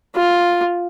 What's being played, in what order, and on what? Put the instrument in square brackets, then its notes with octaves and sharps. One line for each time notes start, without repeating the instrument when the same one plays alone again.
[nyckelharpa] F4